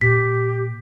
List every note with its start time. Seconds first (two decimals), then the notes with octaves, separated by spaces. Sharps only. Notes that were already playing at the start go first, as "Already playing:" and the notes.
0.01 A#2 G4 B6